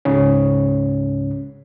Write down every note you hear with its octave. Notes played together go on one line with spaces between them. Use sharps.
C#2 G#2 C#3 C#4